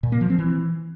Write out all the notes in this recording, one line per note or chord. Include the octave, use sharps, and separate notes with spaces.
A#2
A#3
F3
C4
E3